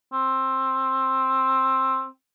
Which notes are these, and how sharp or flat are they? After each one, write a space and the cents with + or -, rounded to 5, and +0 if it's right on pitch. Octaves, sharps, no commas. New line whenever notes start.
C4 +15